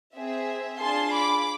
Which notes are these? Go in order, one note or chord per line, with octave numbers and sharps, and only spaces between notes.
C4 G#4 E5
D4 F4 G#4 A5 C6
B5 D6